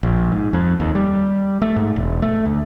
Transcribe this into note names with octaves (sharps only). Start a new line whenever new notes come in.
A#1
G#2
F2
D#2
G3
A3
G#2
E1
A3
D2